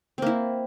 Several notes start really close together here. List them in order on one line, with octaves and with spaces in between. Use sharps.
C4 A#3 E4